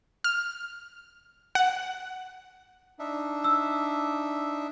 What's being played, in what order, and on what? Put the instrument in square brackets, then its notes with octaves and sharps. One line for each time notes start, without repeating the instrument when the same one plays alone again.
[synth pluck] F6
F#5
[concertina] D4 D#4 E5
[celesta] E6